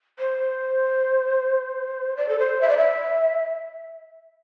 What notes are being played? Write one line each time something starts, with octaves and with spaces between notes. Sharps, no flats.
C5
D5
A4
C5
E5
D5
E5